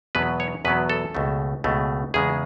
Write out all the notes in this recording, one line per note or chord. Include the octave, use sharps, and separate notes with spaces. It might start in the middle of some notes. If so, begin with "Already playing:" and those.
E2 B2 F#3 B3 B4
C#5
E2 B2 F#3 B3 B4
A4
C#2 B2 A3
C#2 B2 A3
E2 C#3 G#3 G#4